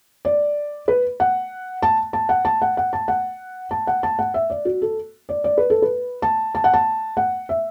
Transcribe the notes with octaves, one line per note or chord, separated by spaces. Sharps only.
D5
B4
F#5
A5
A5
F#5
A5
F#5
F#5
A5
F#5
A5
F#5
A5
F#5
E5
D5
F#4
A4
D5
D5
B4
A4
B4
A5
A5
F#5
A5
F#5
E5